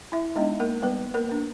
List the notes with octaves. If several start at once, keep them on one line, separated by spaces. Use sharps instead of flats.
E4 E5
G#3 B3 D4 D#4 D#5
A#3 A#4
G3 B3 B4
A#3 A#4
A#3 D4